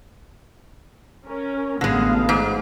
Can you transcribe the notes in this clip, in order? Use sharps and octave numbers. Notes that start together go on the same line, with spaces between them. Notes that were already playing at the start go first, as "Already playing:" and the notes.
C#4 A#4
A1 A2 D3 G#3 B3 F5
G#2